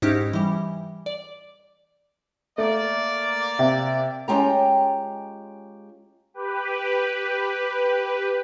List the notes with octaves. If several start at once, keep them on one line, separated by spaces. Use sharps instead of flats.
G#2 C#4 D#4 E4 G4
E3 G3
D5
A3 A#3 D5
C3
G#3 C#4 F4 G4 G5 A#5
G4 B4